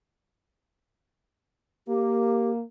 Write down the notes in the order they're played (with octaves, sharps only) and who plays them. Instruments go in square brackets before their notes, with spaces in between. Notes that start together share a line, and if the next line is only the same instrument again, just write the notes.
[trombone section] A#3 [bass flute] G4